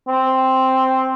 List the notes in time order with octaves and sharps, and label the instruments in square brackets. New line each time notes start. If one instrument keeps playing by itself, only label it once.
[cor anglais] C4